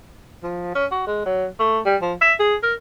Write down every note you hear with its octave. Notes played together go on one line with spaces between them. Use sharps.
F3
C#4
F#4
G#3
F#3
A3
G3
F3
E5
G#4
A#4